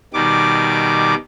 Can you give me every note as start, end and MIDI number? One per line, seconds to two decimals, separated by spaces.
0.14 1.15 47
0.14 1.15 51
0.14 1.15 55
0.14 1.15 86